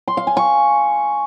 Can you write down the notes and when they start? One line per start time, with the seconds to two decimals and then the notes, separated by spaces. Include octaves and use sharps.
0.08 C6
0.17 F5
0.27 G#5
0.37 C#6